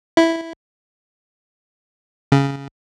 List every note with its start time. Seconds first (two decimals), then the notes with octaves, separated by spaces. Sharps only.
0.17 E4
2.32 C#3